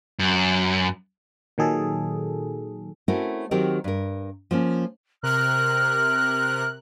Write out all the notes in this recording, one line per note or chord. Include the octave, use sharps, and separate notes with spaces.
F#2
A#2 D#3 F#3 G#4 A4
A3 C4 C#4 E4 F#4 A#4
D#3 F#3 C4 G4 A#4
G2 A#4
F3 A#3 C#4
C3 A#4 F6 F#6